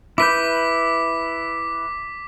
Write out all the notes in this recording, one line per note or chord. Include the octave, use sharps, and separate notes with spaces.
E4 B4 D6 G6 B6